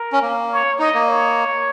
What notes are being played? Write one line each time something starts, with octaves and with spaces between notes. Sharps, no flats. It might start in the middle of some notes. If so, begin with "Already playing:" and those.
Already playing: A#4
C#4
A#3
C#5
D#4 D#5
A#3
C#5